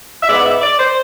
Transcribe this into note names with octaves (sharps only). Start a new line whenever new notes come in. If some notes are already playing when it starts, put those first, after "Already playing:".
E5
G#2 G#3 B3 D5
E5
D5
C5